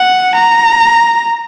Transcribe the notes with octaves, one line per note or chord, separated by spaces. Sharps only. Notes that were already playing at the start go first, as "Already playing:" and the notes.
Already playing: F#5
A#5